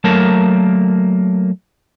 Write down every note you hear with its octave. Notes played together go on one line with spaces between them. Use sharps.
F#3 A3 A#3 A#4 A5